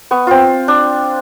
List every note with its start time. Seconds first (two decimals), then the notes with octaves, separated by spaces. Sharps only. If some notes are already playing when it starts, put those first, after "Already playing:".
0.11 B3 C#6
0.27 C4 F4
0.68 D4